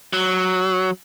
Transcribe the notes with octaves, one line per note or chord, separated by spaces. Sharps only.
F#3